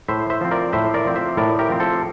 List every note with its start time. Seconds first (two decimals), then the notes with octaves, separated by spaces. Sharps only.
0.08 A2 C5 E5
0.30 C5 E5
0.41 F3 C4
0.51 A#4 D5
0.73 A2 C5 E5
0.94 A#4 D5
1.05 F3 C4
1.16 C5 E5
1.37 A2 A#4 D5
1.59 G4 A#4
1.69 F3 C4
1.80 A4 C5